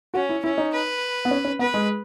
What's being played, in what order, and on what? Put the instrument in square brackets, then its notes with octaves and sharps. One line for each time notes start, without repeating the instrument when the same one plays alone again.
[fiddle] C#4 [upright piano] F#4
[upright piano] E4
[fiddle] C#4 [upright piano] E4
[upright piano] D#4
[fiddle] B4
[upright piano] B3
C#4
C#4
[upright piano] B3 [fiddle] B4
[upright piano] G#3